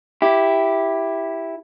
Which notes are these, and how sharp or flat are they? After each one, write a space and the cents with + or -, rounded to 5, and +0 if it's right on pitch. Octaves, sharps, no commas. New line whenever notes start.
E4 +0 G4 +0